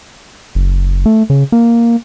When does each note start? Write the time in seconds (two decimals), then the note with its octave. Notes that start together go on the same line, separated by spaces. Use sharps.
0.55 F#1
1.06 A3
1.30 C#3
1.52 A#3